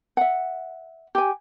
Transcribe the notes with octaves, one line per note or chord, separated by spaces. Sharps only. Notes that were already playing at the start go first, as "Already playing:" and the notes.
E5 F#5
G4 G#5